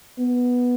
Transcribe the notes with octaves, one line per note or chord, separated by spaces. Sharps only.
B3